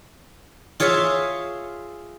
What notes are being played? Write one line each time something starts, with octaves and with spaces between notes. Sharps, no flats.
F4 G#4 C#5 E5 F5